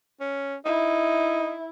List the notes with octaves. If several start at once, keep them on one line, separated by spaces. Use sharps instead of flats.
C#4
D#4 E4